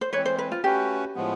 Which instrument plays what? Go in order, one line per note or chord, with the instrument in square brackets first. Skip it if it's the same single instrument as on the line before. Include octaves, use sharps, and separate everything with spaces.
[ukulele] C5
[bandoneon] E3 G#3 C4 [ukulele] B4 C#5
[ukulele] C5
B4
F4
[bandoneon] A3 C#4 F#4 B4 [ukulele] G4
[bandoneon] A2 F3 G#3 B3